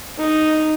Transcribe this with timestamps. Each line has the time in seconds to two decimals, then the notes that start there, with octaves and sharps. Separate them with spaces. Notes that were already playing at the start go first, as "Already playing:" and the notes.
0.18 D#4